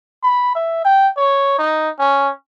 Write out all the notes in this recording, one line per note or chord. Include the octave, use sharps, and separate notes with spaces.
B5
E5
G5
C#5
D#4
C#4